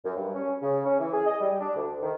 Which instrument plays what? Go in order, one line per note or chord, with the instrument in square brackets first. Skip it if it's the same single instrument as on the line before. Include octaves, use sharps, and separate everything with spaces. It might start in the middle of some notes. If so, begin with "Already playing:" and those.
[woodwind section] F#2
G2
C#4
C#3
C#4
E3
G#4
D#5
G3
D4
D2
D#3